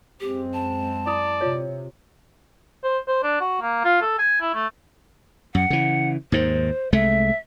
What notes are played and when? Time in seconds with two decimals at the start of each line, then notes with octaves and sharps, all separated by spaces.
0.20 F#2 G#3 C4 G4
0.53 A5
1.07 E4 D5 B5 D#6
1.41 C3 F4 C#5
2.84 C5
3.08 C5
3.23 D4
3.41 F#4
3.61 A#3
3.84 F4
4.01 A4
4.19 G#5
4.41 E4
4.55 A3
5.55 F#2 F#5
5.70 C#3 E3
6.32 D#2 G#2 D#3 C5
6.93 C2 G#3 A3 E5